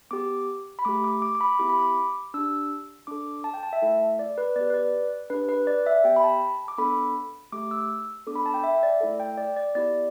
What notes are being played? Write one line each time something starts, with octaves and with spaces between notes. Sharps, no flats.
B3 G4 D6
B5
A3 G4 D6
D6
D6
D6
B5
B3 E4 G4 D6
B5
D6
D4 G4 E6
D4 A4 D6
A5
G5
A5
E5
A3 E4 A4
D5
B4
B3 G4 D5
B4
D5
D4 G4 B4
B4
D5
E5
B3 G4 G5
B5
A5
D6
B3 D4 A4 B5
A3 G4 D6
E6
B3 D4 A4 D6
B5
A5
G5
E5
D5
A3 E4 A4
G5
D5
D5
B3 E4 G4 D5